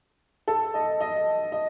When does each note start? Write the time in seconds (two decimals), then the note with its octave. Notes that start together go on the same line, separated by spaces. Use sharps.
0.48 A4
0.74 D#5
1.00 D#5
1.52 D#5